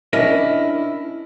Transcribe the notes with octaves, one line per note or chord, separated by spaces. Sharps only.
C#4 D4 E4 A#4 D#5 E5